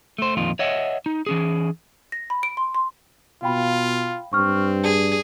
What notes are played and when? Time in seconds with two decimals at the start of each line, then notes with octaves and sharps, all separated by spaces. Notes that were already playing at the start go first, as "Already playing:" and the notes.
0.19 A3 C5
0.37 F2 A#2 D#3 F4
0.59 C#5 D#5 E5 F#5
1.06 D#4
1.27 E3 C#4 G#4
2.12 A#6
2.30 B5
2.43 D7
2.57 C6
2.75 C6
3.43 B2 F4 F5 G5 B5
4.33 G2 C4 C#6 F6
4.84 G#4 D5 A5